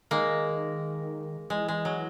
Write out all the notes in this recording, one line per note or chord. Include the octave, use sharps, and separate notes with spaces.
D#3 G#3 A#3
E3 G#3
G#3
F#3